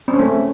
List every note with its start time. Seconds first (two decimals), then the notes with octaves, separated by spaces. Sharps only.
0.08 C4
0.14 C#4
0.19 A3